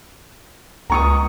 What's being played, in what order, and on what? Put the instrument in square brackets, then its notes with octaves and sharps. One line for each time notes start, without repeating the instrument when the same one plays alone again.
[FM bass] C#2 [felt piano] A#5 C#6 D#6